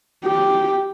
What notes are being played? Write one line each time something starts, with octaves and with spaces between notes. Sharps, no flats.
G4